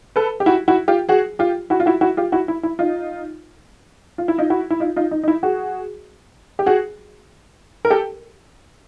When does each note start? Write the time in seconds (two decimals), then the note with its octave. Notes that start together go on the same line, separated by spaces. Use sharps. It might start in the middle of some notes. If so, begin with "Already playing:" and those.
0.16 A4 B4
0.40 G4
0.46 E4 F#4
0.68 E4 F#4
0.88 F4 G4
1.09 F#4 G#4
1.39 F4 G4
1.70 E4 F#4
1.80 F4
1.86 E4 F#4
2.01 E4 F#4
2.17 F4 G4
2.32 E4 F#4
2.48 E4
2.63 E4
2.79 D#4 F4
4.18 F4
4.28 E4
4.38 D#4 F4
4.50 E4 F#4
4.70 E4
4.80 D#4 F4
4.96 D#4 F4
5.11 D#4
5.23 D#4
5.28 E4
5.43 F#4 G#4
6.59 G4
6.66 F#4 G#4
7.85 A#4
7.90 G4 A4